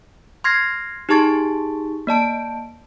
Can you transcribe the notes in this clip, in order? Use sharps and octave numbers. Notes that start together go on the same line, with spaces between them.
C6 F6 G#6 A#6 C7
D#4 G4 G#4 A5 C#6 A6
A#3 D5 A5 D7